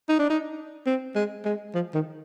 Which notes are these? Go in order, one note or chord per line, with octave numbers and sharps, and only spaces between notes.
D#4
D4
D#4
C4
G#3
G#3
F3
D#3